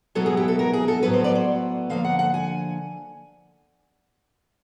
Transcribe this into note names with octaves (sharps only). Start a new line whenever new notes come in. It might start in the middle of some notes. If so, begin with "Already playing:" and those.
B2 F#3 B3 E4 A4
G#4
G4
A4
A#4
G#4
A4
A2 F#3 B3 B4
C5
D5
C5
D3 F3 A#3 F5
F#5
F#5
G#5